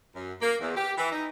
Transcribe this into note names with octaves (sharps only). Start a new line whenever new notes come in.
F#2
A#3
E2
G4
E3
D#4